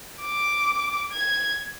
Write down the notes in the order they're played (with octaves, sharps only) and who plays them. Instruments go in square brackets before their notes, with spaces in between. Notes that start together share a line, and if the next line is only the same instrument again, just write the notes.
[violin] D6
G#6